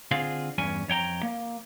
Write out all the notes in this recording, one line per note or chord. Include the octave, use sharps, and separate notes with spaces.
D3 C4 F4 G#4 F5
E2 G2 C#4 G#5
F2 C#5 G5 A#5
A#3